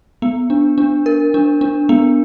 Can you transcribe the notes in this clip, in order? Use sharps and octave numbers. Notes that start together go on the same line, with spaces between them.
B3
D4
D4
A#4
D4
D4
B3